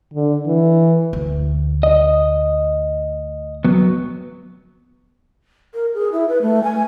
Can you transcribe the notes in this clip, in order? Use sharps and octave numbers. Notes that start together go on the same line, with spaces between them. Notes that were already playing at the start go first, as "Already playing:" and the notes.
D3
E3
D2
D#5
F#3 B3
A#4
G#4
E4
B4
A3
G#5